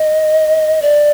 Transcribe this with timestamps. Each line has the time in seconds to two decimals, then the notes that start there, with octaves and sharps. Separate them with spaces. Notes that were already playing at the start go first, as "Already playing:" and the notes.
Already playing: D#5
0.82 D5